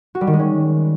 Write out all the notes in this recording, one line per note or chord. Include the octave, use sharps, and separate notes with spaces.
F#4
G3
D#3
G#3
C#4